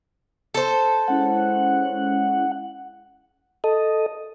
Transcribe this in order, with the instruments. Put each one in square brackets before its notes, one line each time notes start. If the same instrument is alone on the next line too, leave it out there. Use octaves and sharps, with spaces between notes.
[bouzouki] A4 C5
[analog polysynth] G#3 C#4 E4 [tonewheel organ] F#5
[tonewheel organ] A4 D#5